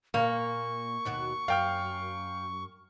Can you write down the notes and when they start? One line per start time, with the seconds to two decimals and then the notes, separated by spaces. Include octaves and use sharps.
0.14 A#2 A#3 C#6
1.05 D#2 B2 F#4
1.48 F#2 F5 G5 F6